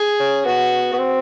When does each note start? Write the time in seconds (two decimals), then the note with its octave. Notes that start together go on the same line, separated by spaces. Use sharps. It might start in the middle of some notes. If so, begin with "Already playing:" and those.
Already playing: G#4
0.20 C#4
0.45 B3 F#4
0.93 B3
0.99 C4